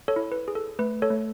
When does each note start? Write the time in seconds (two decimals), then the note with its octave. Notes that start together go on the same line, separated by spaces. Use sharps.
0.08 A4 C#5
0.16 E4
0.32 B4
0.48 G#4
0.55 A4
0.79 A3 B4
1.02 A4 C#5
1.10 A3